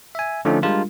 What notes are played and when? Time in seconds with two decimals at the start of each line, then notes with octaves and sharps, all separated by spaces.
0.15 E5 G#5
0.45 D3 F3 A3 C#4 D#4
0.62 G3 G#3 D4 F4 A#4